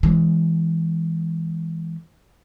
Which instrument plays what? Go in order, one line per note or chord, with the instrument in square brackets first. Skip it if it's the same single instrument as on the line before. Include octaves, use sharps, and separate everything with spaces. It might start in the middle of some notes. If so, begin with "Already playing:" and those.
[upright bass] E3 G#3